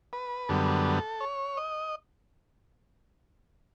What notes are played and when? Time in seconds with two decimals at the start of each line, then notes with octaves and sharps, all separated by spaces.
0.13 B4
0.49 F#2 D3 G3 B3 A4
1.21 C#5
1.57 D#5